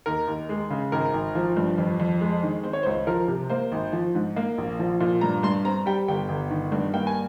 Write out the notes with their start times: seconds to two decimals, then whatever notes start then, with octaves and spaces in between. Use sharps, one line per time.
0.06 D#2 A#4
0.28 D#2
0.49 G#3
0.70 C#3
0.92 G#1 A#4
1.14 G#1
1.35 F3
1.57 G2
1.78 F2
2.00 F2
2.21 G#3
2.43 D#3
2.64 C4 C5
2.73 C#5
2.83 C5
2.86 C#2
3.07 F3 A#4
3.28 C3
3.50 A#3 C5
3.72 G#1
3.93 F3
4.15 G#2
4.36 A#3
4.58 A#1
4.79 F3
5.00 A#2
5.21 G2 A#5
5.43 G2 C6
5.65 C4 A#5
5.86 G3 G5
6.08 G1 G5
6.29 G1
6.51 D#3
6.72 G2
6.93 A#3 G5
7.07 G#5